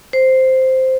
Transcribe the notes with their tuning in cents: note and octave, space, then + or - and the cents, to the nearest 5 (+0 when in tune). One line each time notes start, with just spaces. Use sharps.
C5 -5